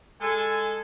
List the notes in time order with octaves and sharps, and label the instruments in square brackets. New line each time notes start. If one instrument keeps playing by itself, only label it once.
[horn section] G#3 A4 [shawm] G#5